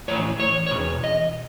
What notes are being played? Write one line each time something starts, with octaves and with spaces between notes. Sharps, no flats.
A2 E3 C#5
C#5
C#5
E2 B2
D#5